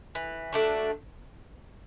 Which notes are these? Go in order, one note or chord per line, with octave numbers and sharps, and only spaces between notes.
E3
A3 D4 F#4